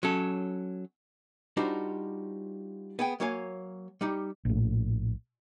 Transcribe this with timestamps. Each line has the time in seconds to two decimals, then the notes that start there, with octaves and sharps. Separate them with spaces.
0.03 F#3 C#4 A4
1.57 G3 D4 D#4 F4 F#4 C5
2.99 B3 G#4 G5
3.20 F#3 A#3 C#5 F5 G#5
4.01 G3 D#4 G4
4.45 A#1 A2